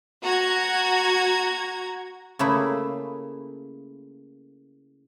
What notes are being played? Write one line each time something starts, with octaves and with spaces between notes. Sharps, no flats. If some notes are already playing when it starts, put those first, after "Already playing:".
F#4 A#5 G#6
C#3 A3 A#3 E4 G#4